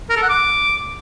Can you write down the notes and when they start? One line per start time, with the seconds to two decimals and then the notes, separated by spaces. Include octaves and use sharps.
0.10 A#4
0.16 A4
0.23 F#5
0.29 D6